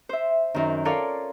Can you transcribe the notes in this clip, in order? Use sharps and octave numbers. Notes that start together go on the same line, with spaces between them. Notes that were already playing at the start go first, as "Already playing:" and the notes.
C5 E5
F#2 D#3
F4 A4 A#4 C#5 D5 F5